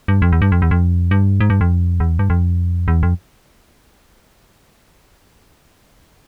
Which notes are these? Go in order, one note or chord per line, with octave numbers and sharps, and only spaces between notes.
G2
F2
E2
G2
F2
E2
F2
G2
G#2
G2
F2
E2
G2
F2
E2
F2